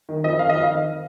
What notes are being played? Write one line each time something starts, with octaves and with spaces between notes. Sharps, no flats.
D#3
F2 D#5
D#3 F5
D#5
F2 F5
D#3